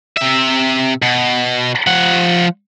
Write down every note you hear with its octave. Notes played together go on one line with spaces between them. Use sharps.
C3 E5
B2
F3 F#5